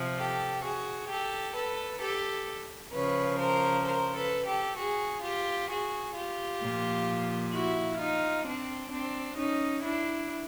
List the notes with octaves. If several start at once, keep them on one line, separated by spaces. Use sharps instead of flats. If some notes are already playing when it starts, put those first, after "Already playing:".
Already playing: C3 F3
G4 A4
F#4 G#4
G4 A4
A4 B4
G4 A4
C#3 F3 B4 C#5
A#4 C5
A#4 C5
A4 B4
G4 A4
F#4 G#4
F4 G4
F#4 G#4
F4 G4
A#2 F3
E4 F#4
D#4 F4
C4 D4
C4 D4
C#4 D#4
D4 E4